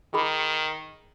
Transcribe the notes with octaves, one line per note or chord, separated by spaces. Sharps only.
D#3 G#4 B5 D#6